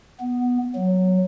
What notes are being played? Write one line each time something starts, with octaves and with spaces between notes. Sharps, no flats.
B3
F#3